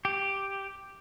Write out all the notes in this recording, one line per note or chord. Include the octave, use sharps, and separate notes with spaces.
G4